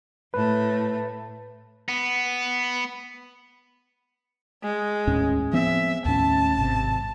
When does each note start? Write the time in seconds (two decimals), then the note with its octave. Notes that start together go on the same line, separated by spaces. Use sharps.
0.34 A2 A3 B4
1.89 B3
4.63 G#3
5.07 D#2 A2 C#4
5.53 F3 B3 C4 E5
6.05 D#2 A2 C#4 A5
6.57 G#1 C3